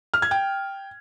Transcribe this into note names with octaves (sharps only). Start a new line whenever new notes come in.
F6
G#6
G5